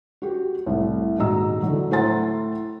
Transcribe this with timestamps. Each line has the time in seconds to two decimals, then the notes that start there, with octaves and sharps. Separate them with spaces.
0.22 F#4 G4
0.67 C2 A2
1.18 D#1 G#2 F#4 D#5 A#5 E6
1.62 D3 E3 F#3
1.91 A2 C5 F#5 A#5 C6 A6